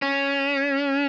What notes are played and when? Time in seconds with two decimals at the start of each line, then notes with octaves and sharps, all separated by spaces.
0.02 C#4